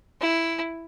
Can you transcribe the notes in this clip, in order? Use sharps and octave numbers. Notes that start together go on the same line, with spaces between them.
E4